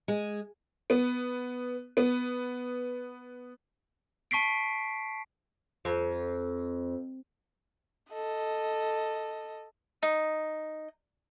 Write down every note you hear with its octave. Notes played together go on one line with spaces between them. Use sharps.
G#3
B3
B3
A5 C#6 B6 C7 D7
F2
A4 D#5
D#4